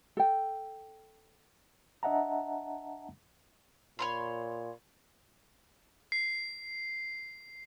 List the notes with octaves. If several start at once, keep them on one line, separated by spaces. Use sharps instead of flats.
A4 G5
D4 D#5 E5 F#5 A5 A#5
A#2 C#5 B5 C6
C7